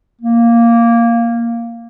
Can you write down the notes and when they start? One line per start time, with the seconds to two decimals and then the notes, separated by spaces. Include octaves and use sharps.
0.21 A#3